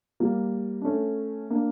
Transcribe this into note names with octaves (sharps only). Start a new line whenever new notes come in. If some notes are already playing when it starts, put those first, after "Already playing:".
G3 A#3
D4
A3 C#4
A#3 D4